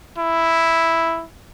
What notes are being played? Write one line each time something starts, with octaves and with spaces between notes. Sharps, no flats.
E4